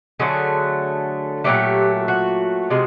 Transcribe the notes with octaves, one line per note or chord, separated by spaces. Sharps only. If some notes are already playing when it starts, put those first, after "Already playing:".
D3 F#3 A3 G#4
A#2 F#3 A3 G4
F#4
C3 F3 G#3